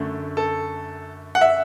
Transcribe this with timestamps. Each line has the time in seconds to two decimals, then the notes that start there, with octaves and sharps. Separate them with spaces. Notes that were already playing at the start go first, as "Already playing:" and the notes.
Already playing: F#2 D3 A3
0.37 A4
1.35 F#5
1.41 E5